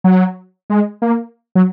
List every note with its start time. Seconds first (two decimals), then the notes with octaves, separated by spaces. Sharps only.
0.04 F#3
0.70 G#3
1.02 A#3
1.55 F#3